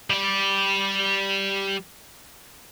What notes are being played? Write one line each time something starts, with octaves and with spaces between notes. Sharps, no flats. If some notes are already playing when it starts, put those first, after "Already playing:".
G3 D5